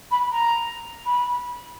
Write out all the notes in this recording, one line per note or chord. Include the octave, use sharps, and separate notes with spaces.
B5
A#5
B5